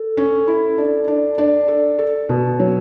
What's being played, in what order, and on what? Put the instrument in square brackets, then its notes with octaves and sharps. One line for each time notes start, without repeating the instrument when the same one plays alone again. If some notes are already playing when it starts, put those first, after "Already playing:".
Already playing: [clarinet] A4
[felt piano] C#4
E4
D4
D4
D4
A4
A4
B2
[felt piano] F#3 [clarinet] C#5